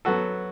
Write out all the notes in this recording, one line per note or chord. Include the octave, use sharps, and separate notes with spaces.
F#3 B3 F#4 A4